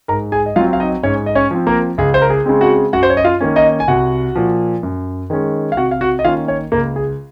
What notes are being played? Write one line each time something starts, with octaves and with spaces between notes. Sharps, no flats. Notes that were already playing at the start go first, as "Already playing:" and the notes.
G#2 A#4 A#5
G#4 G#5
D#5
F#3 C4 F4 F5
F5
D#4 D#5
G#2 C#4 C#5
D#5
C#4 C#5
F3 C4
A#3 A#4
C#2 G#4
C5
A#4
G#4
C#3 G#3 C4
F#4 F#5
F#2 F#4 F#5
C5
C#5
D#5
F4 F5
D#3 A#3 C#4
D#4 D#5
G#5
C2 F#4 F#5
A#2 F3
F#2
D#3 G#3 C#4
F5
C3 F#4 F#5
F5
F#4 F#5
D#5
D#3 A#3 C#4 F4 F5
C#4 C#5
C#2 A#3 A#4
G#4